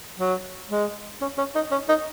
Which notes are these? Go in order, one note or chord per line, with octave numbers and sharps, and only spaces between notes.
F#3
G#3
C#4
C#4
D#4
C#4
D#4